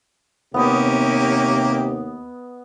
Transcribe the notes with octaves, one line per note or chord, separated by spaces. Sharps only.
D#2 C3 A#3 B3 C#4 G4 D#5